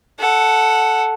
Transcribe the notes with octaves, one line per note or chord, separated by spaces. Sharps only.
A4 F#5